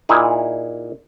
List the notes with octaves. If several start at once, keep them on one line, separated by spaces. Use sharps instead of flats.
A#2 D#4 E4 G#4